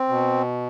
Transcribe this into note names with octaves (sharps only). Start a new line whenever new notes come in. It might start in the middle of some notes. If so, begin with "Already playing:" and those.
Already playing: C4
B2